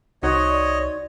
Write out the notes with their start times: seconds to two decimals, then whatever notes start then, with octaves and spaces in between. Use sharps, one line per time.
0.23 C2 D#4 F#4 C5 C#5 D#5
0.49 D5